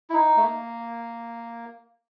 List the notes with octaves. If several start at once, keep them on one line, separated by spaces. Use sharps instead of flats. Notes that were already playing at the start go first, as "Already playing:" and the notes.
E4
D#4
A3
A#3